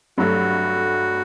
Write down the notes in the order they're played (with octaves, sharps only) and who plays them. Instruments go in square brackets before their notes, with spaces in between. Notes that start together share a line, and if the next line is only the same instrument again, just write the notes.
[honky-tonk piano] G2 F#3 A3 [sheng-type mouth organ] F#4